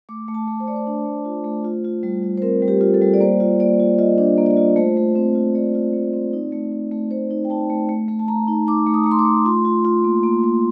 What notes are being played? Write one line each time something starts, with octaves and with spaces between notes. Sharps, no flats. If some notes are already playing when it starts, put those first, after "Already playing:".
A3 D6
A3
A5
A3
C5
A3 D5
C5
D4
A3
F4
A3
F4
F4
G3
G3
C5
C4 A#4
G3
G4
F4
A4
G3
D5
A#3 C5
F4
A#3 D5
F4
F4 D#5
D4
A#3
D5
D#5
F4
A3 C5
A3
C4
F4
A3 D5
F4
A3
C4
D#4
A3
A3
A3
A3 C5
D#4
G5
D#4 A5
A3
A3
A3
A5
A3 A#5
D#4
D#4 D6
A3
D#6
A3 A#5
C6
D6
A3
F4 C6
F4
F4
A#3
A#3
A#3